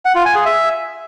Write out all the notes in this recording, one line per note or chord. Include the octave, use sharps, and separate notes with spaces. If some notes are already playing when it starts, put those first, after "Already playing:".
F#5
F4
G#5
G#4
E5